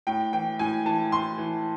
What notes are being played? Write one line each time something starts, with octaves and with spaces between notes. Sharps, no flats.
A2 G5
E3 G5
A2 G#5
E3 A5
A2 C6
E3